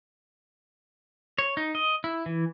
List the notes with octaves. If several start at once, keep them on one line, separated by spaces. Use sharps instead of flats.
C#5
D#4
D#5
E4
E3